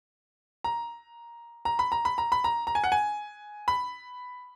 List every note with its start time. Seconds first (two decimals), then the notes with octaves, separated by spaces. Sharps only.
0.64 A#5
1.65 A#5
1.79 B5
1.92 A#5
2.05 B5
2.18 A#5
2.32 B5
2.44 A#5
2.67 A#5
2.75 G#5
2.84 F#5
2.92 G#5
3.68 B5